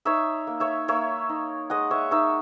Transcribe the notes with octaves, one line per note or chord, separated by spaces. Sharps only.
D#4 C#5 E5
A#3
C#5 E5
A#3 C#5 E5
D#4
G#3 D#5 F#5
C#5 E5
D#4 C#5 E5